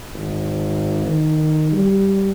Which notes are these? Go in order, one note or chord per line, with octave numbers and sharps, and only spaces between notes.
G#1
D#3
G3